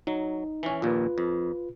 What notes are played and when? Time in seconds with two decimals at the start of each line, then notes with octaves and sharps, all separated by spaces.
0.07 F#3 D#4
0.63 E3 C#4
0.82 A#1 D#2 A#2 F4 B4
1.18 F2